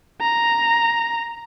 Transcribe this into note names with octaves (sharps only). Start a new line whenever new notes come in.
A#5